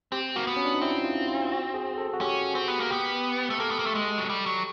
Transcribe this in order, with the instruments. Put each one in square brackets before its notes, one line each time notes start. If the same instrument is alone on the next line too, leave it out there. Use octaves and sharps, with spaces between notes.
[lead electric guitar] C4 [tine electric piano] G4
[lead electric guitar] A#3 [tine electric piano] F#4
[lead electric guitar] B3
[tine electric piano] C#4
D4
D#4
[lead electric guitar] C4 [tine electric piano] E4
[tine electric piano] F4
F4
F#4
G#4
A4
F#4
[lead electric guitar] C#4 [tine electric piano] G4
[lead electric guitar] C4
B3
A#3
[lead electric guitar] B3 [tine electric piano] G4
[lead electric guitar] A3
[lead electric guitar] A#3 [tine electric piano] A4
[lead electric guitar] B3
A#3
A3
G#3
F#3
G3
F#3